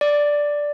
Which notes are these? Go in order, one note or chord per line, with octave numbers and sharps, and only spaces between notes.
D5